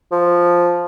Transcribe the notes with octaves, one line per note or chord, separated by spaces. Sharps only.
F3